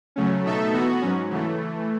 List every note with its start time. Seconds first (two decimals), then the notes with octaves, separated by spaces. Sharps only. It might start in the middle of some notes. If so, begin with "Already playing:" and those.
0.16 C#3 F#3 A3 C#4
0.45 B2 A3 D#4 A4 E5
0.73 E3 B3 F#4
1.02 G#2 F#3 C#4
1.30 C#3 E3 A3